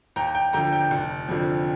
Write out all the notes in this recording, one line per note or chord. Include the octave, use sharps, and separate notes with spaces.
D#2 G5 A#5
G5
D3 F3 G5 A#5
G5
F1
F2 D3 F3